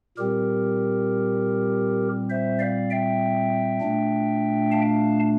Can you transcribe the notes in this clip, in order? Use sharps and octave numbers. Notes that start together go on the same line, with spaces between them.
A#2 G3 C4 G4 A#4
C5 E5
D5 F5
E5 G5
A#2 A3 D4
F5 A5